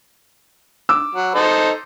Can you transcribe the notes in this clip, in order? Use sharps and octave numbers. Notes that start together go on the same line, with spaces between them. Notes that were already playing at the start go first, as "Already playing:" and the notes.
D6 E6
F#3
D#4 A4 C5